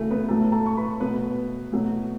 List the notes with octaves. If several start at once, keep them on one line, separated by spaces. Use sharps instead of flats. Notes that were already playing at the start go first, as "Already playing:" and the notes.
Already playing: C#3 E3 A3 E4 F#4 A4
B3 B4
A2 F#3 A3 A4 A5
A4 A5
C#6
B4 B5
B2 F#3 A3 B3 B4
B2 F#3 A3